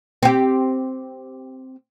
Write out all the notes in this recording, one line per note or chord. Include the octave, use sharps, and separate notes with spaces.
C4 G4